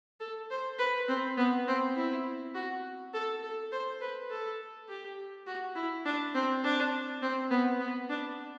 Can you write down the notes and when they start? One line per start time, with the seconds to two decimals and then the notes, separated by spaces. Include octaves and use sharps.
0.20 A4
0.50 C5
0.79 B4
1.08 C4
1.37 B3
1.67 C4
1.96 E4
2.55 F#4
3.13 A4
3.43 A4
3.72 C5
4.01 B4
4.30 A4
4.88 G4
5.47 F#4
5.75 E4
6.05 D4
6.34 C4
6.64 D4
7.22 C4
7.51 B3
7.80 B3
8.09 D4